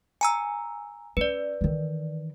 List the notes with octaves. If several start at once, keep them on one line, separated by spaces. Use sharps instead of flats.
G#5 A#5 E6
C#4 B4 D5
D#3 E3